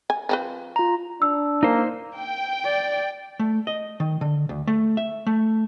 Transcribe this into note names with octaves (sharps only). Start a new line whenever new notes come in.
G#5
F3 C4 B4
F4 A#5
D4 E6
A#3 D#4 C5
G5
D5
A3
D#5
D#3
D3
D2
A3
E5
A3